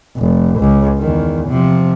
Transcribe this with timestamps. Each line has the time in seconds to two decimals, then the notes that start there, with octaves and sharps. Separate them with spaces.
0.17 F1
0.59 C#2
1.00 E2 D#3
1.48 C3 F3